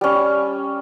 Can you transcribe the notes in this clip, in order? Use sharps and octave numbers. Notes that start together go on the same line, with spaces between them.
G3 C#4